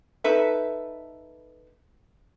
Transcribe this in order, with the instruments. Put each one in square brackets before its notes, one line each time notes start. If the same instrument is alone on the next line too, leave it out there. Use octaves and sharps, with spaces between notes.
[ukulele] D#4 A4 B4 E5